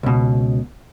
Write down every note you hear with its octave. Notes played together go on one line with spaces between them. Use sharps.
C#2 B2